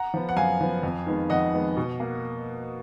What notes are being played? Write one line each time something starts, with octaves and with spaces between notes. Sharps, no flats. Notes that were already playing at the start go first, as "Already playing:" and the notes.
Already playing: F#5 A#5
F3 B3
F#5
F#2 F5 G#5
F3 B3
F2
D#3 G#3 B3
F2 D#5 F#5
D#3 G#3 B3
B2
A#3